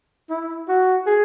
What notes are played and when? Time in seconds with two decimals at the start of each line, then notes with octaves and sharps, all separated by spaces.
0.30 E4
0.68 F#4
1.07 G#4